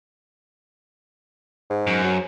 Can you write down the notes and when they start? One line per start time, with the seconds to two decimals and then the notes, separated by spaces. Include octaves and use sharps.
1.70 G#2
1.87 F#2
2.04 F#3